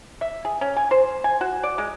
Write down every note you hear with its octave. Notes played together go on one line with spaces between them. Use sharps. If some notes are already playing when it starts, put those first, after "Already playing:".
E5
G#4
C#4
G#5
C5
G#5
F#4
D5
G#3